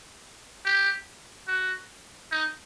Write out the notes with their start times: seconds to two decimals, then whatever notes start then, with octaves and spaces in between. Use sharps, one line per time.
0.65 G4
1.48 F#4
2.32 D#4